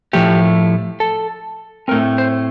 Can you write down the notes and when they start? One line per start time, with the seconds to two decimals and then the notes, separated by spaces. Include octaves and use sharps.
0.13 A2 F3 A3 G4
1.00 A4
1.88 A2 A3 C4 A#4
2.18 C5